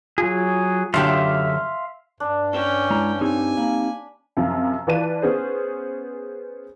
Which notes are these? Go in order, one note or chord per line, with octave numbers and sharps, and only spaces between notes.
F#3 F4 G#4
F#2 D3 G4 E5 F5 C6
G2 D4
C#4 G5
G#3 E4 A#5
C4 D#4 G4 G#5
A#3 B5
F#2 C3 F3
E3 F4 B4 D5 A5 D#7
B3 C#4 G#4 C5